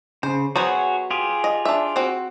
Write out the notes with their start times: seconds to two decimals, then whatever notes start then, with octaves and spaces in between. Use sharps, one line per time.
0.23 C#3 C5
0.56 F#3 B3 F#4 G#4 C5 C#5
1.11 F4 G4 G#4
1.44 D#5
1.65 D4 E5
1.96 C4 F#4